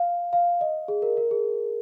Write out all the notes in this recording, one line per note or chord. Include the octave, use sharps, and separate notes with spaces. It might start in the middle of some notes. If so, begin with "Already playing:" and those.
Already playing: F5
F5
D#5
G#4
A#4
A#4
G#4